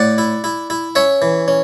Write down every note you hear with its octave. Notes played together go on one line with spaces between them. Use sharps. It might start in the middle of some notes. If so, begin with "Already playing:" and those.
Already playing: A2 D5 F#5
E4
E4
E4
C#4 C#5 E5
E3
C#4